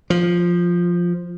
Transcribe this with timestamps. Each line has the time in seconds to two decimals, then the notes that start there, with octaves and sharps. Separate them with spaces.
0.10 F3